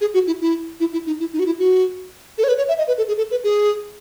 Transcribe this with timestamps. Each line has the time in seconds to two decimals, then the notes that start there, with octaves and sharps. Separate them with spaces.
0.01 G#4
0.14 F#4
0.27 E4
0.41 E4
0.80 E4
0.93 E4
1.06 D#4
1.20 E4
1.33 D#4
1.39 F#4
1.46 E4
1.59 F#4
2.38 A4
2.44 C#5
2.48 B4
2.58 C#5
2.69 E5
2.78 D#5
2.87 B4
2.98 A4
3.08 G#4
3.18 A4
3.31 B4
3.44 G#4